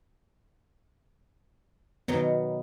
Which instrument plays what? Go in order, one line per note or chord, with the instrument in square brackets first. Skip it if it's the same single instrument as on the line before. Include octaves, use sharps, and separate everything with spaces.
[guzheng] B2 D#3 F#3 [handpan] B3